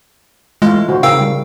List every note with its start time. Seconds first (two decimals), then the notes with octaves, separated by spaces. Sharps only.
0.62 E3 G#3 A3 F4
0.89 D3 F#4 C5
1.03 C#3 A#4 F5 G5 E6
1.20 C#3 G3